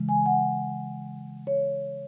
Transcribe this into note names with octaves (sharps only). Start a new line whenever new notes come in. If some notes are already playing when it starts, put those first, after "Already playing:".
Already playing: C#3 E3 G#3
G#5
F#5
C#5